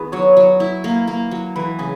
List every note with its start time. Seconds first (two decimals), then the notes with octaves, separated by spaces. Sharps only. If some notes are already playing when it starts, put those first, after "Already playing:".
Already playing: D#3 B3 E4 F#4 G#4 B4
0.12 F#3 C#5
0.37 F#3
0.60 E4
0.84 A#3
1.08 A#3
1.31 F#3
1.56 E3 B4
1.79 C#3 G#4